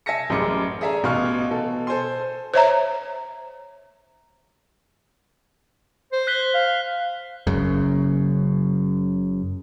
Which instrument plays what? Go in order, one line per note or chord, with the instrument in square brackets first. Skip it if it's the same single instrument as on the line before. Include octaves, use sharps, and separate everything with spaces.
[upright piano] E5 G#5 A5 A#6 C#7
A1 F#2 G3 G#4 D6 C#7
G#4 A4 D5 E5 G#5 A#5
A1 B2 F5 G#5 C#6 F6
B2 A4
A4 C5 G#5 C6
[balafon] C5 C#5 E5 A#5
[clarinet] C5
[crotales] F#6 B6 G7
[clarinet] F5
[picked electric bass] F#1 F#2 C#3